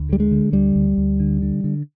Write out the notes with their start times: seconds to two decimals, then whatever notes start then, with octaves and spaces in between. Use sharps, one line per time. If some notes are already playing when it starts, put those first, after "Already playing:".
Already playing: D2
0.09 D3 G3
0.20 G#3
0.31 D3
0.52 D2 G3
0.76 D2
0.98 D2
1.20 D3
1.42 D3
1.64 D3